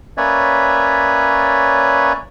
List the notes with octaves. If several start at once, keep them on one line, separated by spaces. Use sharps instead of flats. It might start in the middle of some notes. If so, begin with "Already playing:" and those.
A#3 C#4 B4 C#5 D5 E5